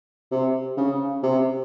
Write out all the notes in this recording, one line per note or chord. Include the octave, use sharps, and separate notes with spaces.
C3
C#3
C3